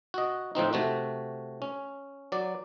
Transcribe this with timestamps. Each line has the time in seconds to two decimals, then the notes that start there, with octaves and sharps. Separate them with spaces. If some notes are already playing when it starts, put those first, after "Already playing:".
0.14 F#4 D#5
0.55 A2 F3 C4 D#4
0.73 C3 A3 F#4
1.62 C#4
2.32 F#3 D5